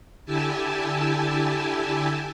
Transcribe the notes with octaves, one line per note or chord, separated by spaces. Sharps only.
D3 E4 G4 E5 G#5 A5